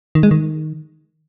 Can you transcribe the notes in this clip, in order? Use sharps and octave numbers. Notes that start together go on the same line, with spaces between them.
D#3
G#3
D#3